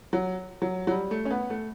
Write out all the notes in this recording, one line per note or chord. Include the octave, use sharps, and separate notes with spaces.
F#3
F#3
F#3
G3
A3
C#4
B3
A3